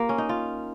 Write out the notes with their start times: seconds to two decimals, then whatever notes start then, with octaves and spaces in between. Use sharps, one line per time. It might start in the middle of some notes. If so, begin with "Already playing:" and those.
Already playing: A#3 F4 G4
0.09 C#4
0.18 D#4
0.29 F4